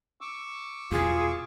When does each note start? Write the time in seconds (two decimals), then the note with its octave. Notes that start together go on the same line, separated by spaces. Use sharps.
0.21 C#6 D6 E6
0.92 E2 B2 F4 G#4